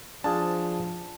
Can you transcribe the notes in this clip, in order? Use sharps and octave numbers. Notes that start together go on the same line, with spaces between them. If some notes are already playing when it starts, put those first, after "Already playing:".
F3 D4 F4 G#4 A5